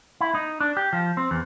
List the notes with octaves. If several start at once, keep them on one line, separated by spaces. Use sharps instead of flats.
E4
D#4
D4
G4
F3
C4
E2